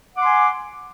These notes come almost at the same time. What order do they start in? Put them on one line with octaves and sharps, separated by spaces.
F#5 D6 C6 G#5